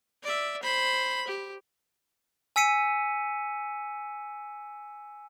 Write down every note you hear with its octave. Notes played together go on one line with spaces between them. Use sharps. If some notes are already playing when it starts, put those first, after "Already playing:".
D5 E5
C5 B5
G4
G#5 E6 B6 C#7 D#7